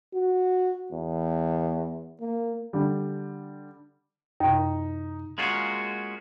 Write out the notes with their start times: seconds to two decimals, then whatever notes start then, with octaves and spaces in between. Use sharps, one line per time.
0.14 F#4
0.92 E2
2.21 A#3
2.73 D3 G3
4.40 F#2 C3 D#4
5.38 G#3 A#3 C#4 F4 F#4